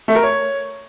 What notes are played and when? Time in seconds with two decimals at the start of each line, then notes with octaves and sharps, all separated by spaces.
0.08 A3
0.15 A#4
0.23 C#5